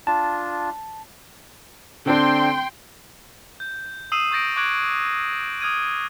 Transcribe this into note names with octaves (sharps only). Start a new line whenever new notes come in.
D4 F4 A5
D3 C4 D4 G5 C6
G6
D#6 E6 C7 D#7 E7 F#7
C#6 G6 A6 A#6 D7
C#6 D6 F#6 G#6 D7 F#7
D#6 F6 G#6 D#7